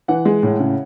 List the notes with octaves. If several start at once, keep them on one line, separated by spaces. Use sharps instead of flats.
E3 F#5
G#3
A2
C#3